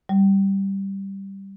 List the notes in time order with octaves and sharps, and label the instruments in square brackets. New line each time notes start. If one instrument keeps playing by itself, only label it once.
[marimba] G3